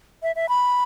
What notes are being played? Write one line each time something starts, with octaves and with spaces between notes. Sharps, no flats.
E5
E5
B5